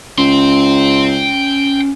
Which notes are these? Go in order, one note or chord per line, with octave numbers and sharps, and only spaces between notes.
C#2 C#4 G5 C6